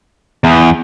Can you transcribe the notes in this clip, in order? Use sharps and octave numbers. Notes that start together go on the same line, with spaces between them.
E2